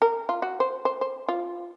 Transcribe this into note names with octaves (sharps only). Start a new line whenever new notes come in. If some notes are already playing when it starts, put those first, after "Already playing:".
A#4
F4
F#4
C5
C5
C5
F4